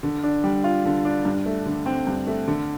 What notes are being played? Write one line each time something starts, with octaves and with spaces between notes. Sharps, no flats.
D3
D4
G3
F4
D3
D4
G2
A3
D3
C4
G2
A3
D3